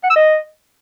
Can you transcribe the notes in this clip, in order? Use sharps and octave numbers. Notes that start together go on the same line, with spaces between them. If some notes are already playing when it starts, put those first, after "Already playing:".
F#5
E6
D#5